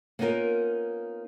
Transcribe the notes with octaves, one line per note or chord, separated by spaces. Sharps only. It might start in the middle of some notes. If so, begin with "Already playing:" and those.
A#3 B3 C#4 D#4 F4 A#4